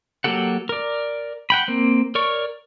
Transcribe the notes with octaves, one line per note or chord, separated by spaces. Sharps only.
F#3 A#3 G4 A4 F#5
A#4 D5
F#5 G5 B5
A#3 C4
A#4 C#5 D5 C#6